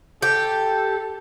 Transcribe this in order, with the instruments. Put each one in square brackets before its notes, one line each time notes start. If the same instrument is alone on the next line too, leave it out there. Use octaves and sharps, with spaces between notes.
[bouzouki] G4 [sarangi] A4